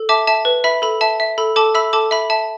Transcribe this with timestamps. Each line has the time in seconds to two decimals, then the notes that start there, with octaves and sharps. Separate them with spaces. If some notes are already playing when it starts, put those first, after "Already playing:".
Already playing: A4
0.09 E5 A5 D6
0.27 E5 A5
0.45 B4
0.64 E5 B5
0.82 A4 B5
1.01 E5 A5
1.20 E5
1.38 A4 B5
1.56 A4 A5 D6
1.75 E5 B5 E6
1.93 A4 A5 D6
2.11 E5 B5
2.30 E5 A5